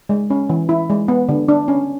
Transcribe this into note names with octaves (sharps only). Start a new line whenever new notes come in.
G#3
C#4
E3
E4
G#3
B3
D3
D4
C#4